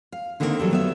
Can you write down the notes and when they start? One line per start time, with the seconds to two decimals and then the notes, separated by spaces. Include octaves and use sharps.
0.12 F5
0.40 D3 D#3 A#3 C4 E4 A#4
0.59 F#3 G3 A4
0.71 F#3 B3 E5